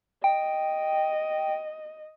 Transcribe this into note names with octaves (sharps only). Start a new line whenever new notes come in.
D#5 G5